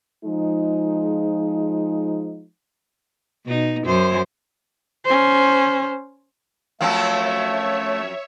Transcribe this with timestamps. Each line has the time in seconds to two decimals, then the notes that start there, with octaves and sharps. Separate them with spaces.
0.25 F3 G#3 D#4
3.46 B2 D#4
3.84 F#2 C5
5.06 C#4 C5
6.81 F#2 F3 A3 C4 C#5 E5 F5 A5